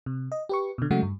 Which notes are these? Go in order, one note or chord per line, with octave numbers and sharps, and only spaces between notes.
C3
D#5
G4 B4 C#6
B2 D3
C#3 F#3 G#3 A3 F#4
G2